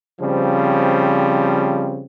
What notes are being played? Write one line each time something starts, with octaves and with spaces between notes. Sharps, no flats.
C#3 F3 G3 C4